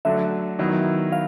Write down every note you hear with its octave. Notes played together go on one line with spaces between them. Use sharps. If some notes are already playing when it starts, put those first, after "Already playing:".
D3 F#3 A3 D4 E5
D#3 F#3 B3 E4
F5